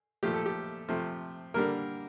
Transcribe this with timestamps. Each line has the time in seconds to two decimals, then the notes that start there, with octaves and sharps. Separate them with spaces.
0.23 A#2 F3 A3 G4
0.34 A4
0.46 G4
0.88 C3 F3 A3
1.54 D3 G3 A#3 A#4